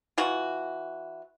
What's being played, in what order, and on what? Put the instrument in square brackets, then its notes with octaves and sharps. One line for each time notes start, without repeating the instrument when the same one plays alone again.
[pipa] E3 F4 F#4